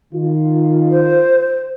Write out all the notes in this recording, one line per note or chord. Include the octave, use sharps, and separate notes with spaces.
D#3 F4
C5